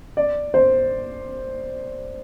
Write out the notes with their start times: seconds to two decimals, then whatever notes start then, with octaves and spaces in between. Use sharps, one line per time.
0.17 D5
0.54 C5